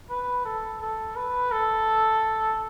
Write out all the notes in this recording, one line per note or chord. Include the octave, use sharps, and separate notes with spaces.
B4
A4
A4
B4
A4